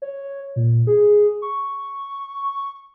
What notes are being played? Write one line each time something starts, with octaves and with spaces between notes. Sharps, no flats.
C#5
A#2
G#4
C#6